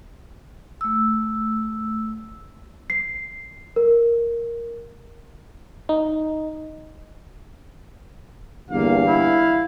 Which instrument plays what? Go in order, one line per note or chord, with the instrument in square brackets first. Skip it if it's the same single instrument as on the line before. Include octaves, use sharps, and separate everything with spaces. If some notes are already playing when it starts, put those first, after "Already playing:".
[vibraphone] A3 E6
[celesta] C7
A#4
[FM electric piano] D#4
[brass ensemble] G1 E2 G2 [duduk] A#3 [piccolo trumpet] F5
[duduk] E4